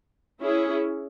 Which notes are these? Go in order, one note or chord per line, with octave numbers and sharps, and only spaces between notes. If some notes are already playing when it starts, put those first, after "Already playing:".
C#4 E4 G#4